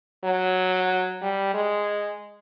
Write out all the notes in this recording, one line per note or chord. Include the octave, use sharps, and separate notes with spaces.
F#3
G3
G#3